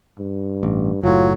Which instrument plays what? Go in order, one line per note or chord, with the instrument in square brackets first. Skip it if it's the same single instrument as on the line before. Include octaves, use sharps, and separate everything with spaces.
[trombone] G2
[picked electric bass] A1
[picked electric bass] F#1 A2 [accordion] F#3 [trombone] F4